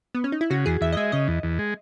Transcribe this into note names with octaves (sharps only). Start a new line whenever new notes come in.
B3
C#4
D#4
E4
C#3 F#4
E2 G#4
E2 E5
D#5
G#3 E5
C#3 D#5
E2
E2
G#3